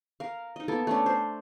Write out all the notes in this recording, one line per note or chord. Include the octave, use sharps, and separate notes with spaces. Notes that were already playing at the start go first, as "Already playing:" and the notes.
A#4 F5
D#4 D#5
A#3 B3 A4 D6
A3 C#4 D4
C5